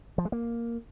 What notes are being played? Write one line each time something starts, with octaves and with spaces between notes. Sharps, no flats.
F3
G#3
A#3